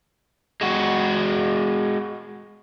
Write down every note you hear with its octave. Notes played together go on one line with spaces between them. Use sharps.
G#3 F#4